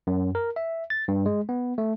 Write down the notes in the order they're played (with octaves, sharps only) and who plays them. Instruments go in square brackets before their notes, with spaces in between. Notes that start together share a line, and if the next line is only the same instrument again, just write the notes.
[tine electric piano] F#2
A#4
E5
A6
G2
G#3
B3
A3